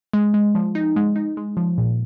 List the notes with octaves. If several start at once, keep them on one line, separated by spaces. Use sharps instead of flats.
G#3
G#3
F3
D#4
G#3
D#4
G#3
F3
A#2